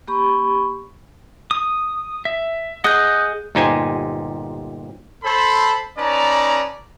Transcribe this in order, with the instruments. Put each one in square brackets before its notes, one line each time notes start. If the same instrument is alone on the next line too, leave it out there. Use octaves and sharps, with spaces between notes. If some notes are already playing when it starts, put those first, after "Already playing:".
[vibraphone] A#3 G4 B5 C#6
[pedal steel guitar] D#6
E5
[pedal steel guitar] G#4 D#5 F#5 [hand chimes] D#6 F#6 G6
[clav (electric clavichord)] G1 A#2 D#4 G4 C5 G#5
[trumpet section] A4 C5 B5
C#4 D#4 B4 D5 A5 A#5